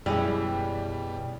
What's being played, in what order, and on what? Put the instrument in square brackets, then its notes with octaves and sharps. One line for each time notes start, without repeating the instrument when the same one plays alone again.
[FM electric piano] F#2 G#4 [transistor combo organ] B2 [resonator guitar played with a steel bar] E3 G#3 C#4 [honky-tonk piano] G3